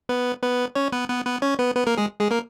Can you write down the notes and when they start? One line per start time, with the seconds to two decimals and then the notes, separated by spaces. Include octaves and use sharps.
0.09 B3 B4
0.42 B3 B4
0.75 C#4 C#5
0.92 B3 B4
1.09 B3 B4
1.25 B3 B4
1.42 C#4 C#5
1.59 B3 B4
1.76 B3 B4
1.87 A#3 A#4
1.97 G#3 G#4
2.20 G#3 G#4
2.31 A#3 A#4